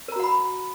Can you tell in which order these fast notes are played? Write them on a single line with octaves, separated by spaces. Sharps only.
A#4 A#5 F#4 F#5 B5